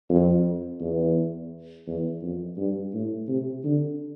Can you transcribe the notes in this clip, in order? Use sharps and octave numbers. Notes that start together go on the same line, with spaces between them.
F2
E2
E2
F2
G2
A2
C3
D3